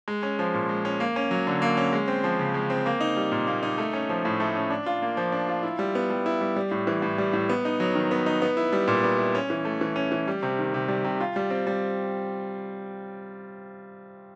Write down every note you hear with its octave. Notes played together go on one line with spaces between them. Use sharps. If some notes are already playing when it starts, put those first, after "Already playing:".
G#3
C#4
F3
A#2
G#3
C#4
A#3
C#4
F#3
D3
A#3
C#4
G#3
C4
F3
C#3
G#3
C4
A#3
D#4
G3
A#2
A#3
D#4
A3
C#4
F3
A2
A3
C#4
D4
F4
A#3
F3
D4
F4
E4
G3
B3
G3
E4
G3
G3
A2
E3
A2
G3
A2
B3
D#4
F#3
D#3
B3
D#4
B3
E4
G3
A#2
B3
E4
C#4
E3
A3
E3
C#4
E3
G3
C3
D#3
C3
G3
C3
F4
G3
C4
G3